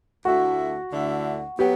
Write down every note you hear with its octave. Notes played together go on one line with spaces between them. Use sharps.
D2 D3 A3 E4 F#4
D2 D3 A3 E4
F#3 B3 G4